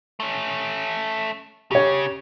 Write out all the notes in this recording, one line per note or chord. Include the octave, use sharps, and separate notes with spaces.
A3 C#4
C#3 G4 C#5